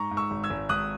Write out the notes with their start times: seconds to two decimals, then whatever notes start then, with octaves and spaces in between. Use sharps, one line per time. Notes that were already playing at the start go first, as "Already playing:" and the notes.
Already playing: G#2 A#5 C#6
0.11 G#2
0.17 C#6 E6
0.31 G#1
0.44 E6 G#6
0.50 G#1
0.69 G#1 D#6 F#6